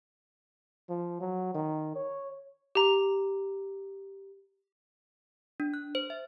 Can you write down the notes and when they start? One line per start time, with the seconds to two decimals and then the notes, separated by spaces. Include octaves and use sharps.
0.89 F3
1.21 F#3
1.55 D#3
1.96 C#5
2.75 G4 A#5
5.60 D4
5.74 F#6
5.95 C5
6.10 E5